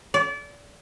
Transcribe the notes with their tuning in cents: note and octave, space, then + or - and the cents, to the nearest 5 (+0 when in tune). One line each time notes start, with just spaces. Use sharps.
D5 -30